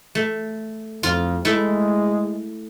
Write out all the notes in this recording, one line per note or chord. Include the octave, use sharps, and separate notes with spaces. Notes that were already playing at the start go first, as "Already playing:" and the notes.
A3
F2 F4
G#3 A3 E4